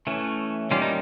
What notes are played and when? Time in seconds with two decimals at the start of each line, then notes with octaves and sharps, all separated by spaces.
0.07 E3 A3 C#4
0.71 D#3 G3 A#3 C#4 F4
0.82 D#4